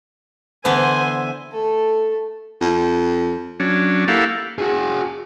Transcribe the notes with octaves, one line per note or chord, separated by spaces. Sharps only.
D3 E3 B3 C5 E5 G#5
A3 A4
F2
F#3 C#4 D4
A#3 E4 G4 A4 F5 F#5
F#4 G#4